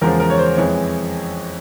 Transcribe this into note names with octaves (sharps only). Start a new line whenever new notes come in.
E2 C#3 F3 G#3 A#4
A#4
C#5
C5
F2 E3 G#3 C#5